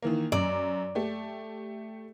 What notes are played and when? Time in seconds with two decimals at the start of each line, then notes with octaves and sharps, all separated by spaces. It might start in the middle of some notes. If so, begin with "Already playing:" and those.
0.02 D#3 E3 A#3
0.32 F#2 D5
0.95 A3 G4